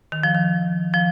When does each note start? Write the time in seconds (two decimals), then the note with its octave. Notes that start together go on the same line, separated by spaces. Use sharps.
0.12 D#3
0.23 F3
0.35 D#3
0.94 F3